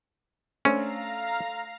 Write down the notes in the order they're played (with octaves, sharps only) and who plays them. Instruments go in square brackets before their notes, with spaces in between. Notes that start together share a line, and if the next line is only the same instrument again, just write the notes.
[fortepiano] A3 D4 C5 [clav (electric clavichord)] C#4 [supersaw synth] F5 A#5